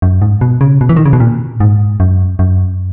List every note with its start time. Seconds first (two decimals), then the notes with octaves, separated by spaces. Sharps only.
0.02 F#2
0.22 G#2
0.41 B2
0.61 C#3
0.81 B2
0.89 E3
0.96 D#3
1.05 C#3
1.13 B2
1.20 A#2
1.60 G#2
2.00 F#2
2.39 F#2